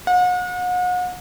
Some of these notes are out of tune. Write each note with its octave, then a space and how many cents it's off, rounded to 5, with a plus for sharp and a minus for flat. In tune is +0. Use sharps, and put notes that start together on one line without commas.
F#5 -40